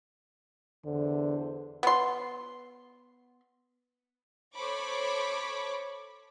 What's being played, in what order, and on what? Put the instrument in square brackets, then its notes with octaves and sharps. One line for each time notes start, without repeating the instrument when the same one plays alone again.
[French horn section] E2 C5 [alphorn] D3
[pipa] B3 C6
[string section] A4 C5 C#5 B5 C#6 D6